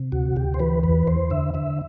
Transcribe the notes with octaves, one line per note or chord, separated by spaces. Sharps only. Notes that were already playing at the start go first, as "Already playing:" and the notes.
Already playing: C3
D2 F#4
D2 G4
C5
E3 B4
E2 B4
E2 C5
D3 E5
D3 E5